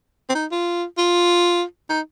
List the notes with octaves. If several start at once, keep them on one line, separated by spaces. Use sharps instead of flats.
C4
D#4
F4
F4
D#4